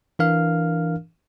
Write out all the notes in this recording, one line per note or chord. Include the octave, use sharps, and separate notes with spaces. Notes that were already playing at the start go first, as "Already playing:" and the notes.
E3 D4 A#4 F5 F6